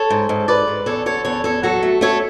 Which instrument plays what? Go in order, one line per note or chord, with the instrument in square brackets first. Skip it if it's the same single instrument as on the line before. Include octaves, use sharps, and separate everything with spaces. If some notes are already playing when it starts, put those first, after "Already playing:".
Already playing: [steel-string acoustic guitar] A4 C#5
G#2
G#2
G#2 B4 D5
G#2
E2 A4 C#5
D3 A4 C#5
E2 A4 C#5
E2 A4 C#5
F#3 F#4 A4
A3
A3 A4 C#5